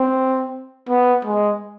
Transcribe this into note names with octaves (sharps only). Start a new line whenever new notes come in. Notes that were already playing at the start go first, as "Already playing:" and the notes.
Already playing: C4
B3
G#3